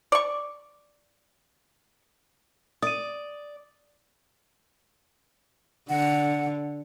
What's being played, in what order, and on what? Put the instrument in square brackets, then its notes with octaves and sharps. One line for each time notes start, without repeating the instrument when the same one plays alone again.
[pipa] D5 C#6
[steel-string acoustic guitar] D5 [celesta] D#6 D#7
[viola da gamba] D3 [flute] F#5